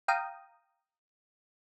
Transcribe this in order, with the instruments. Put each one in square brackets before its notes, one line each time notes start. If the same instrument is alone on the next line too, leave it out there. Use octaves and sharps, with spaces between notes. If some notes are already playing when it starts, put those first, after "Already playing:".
[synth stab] F5 G5 A#5 D#6